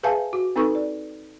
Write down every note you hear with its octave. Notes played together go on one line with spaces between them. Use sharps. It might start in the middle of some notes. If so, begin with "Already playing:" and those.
G#4 B4 E5 F5 G#5 A5
F#4
C4 D#4 A4 B4 C#6
D5